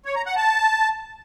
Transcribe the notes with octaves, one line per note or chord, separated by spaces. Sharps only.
C#5
A#5
F#5
A5